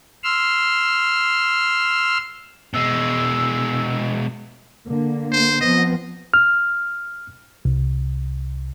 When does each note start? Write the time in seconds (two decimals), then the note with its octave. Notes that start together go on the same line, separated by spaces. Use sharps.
0.23 C6 E6 F6
2.74 B2 G#3 E6
4.87 D3 A#3
5.32 C5
5.61 F3 B3 C4 D#5
6.34 F6
7.65 C2